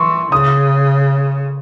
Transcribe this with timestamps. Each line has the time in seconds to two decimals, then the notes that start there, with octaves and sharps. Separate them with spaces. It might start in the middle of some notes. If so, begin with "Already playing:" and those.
Already playing: E3 C6 C#6
0.32 C#3 D#6